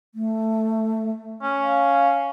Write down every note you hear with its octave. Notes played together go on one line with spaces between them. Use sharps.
A3
C#4
F5